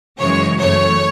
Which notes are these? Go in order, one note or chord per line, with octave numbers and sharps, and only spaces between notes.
F#2 C#3 E3 G#3 C#5
F#2 E3 A3 C#5